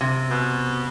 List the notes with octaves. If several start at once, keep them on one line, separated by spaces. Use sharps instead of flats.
C3
B2